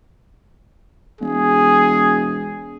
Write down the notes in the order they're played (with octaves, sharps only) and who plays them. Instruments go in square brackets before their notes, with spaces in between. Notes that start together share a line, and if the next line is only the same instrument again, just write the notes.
[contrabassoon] E1 [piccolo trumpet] G#4